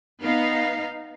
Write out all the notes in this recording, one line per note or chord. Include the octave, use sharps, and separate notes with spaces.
B3 D#4 F5